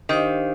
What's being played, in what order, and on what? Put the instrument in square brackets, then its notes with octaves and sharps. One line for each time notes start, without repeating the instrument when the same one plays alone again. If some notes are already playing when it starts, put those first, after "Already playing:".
[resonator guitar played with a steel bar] D#3 [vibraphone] D4 G4 C5 F5